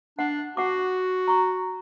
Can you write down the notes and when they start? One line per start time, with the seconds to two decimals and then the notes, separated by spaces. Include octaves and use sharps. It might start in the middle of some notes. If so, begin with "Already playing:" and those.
0.19 D4 F#5
0.57 F#4 F#5 D6
1.28 A#5 C#6